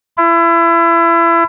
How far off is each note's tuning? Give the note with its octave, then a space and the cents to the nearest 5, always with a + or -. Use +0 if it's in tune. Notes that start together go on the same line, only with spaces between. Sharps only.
E4 +30